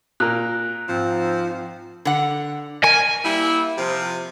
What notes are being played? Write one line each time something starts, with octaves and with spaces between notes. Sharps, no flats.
A#2 A#4 F#6
G#2 F3 C4
D3 F#5
A#4 G#5
G3 A#3 E4
C3 F3